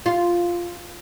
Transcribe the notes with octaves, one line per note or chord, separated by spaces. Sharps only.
F4